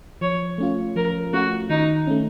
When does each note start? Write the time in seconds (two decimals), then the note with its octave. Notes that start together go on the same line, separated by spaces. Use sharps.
0.21 F3 C#5
0.58 A3 C#4 F4
0.96 F3 A#4
1.33 A3 C#4 F4 F#4
1.70 D#3 D#4
2.07 A3 C#4